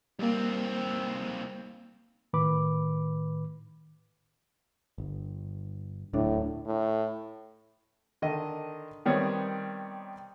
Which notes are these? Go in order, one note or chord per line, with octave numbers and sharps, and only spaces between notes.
D#2 G3 A#3 C4
A2 D#3 B4 B5 D6
G1
D1 A2 D4
A2
D3 D#3 D#5
D#3 G3 B3 C4 C#5